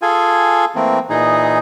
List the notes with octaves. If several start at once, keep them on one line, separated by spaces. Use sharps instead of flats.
F4 G#4 A4 G#5
E3 A3 A#3 C4
A#2 E3 D#4 G#4